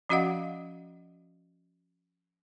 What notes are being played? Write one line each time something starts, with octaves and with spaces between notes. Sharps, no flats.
F3 C#4 F#4 D#5 F5 F#5